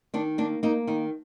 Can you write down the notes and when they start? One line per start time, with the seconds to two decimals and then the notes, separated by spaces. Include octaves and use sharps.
0.14 D#3 D4
0.38 A#3 D4
0.63 A#3 D#4
0.87 D#3 D#4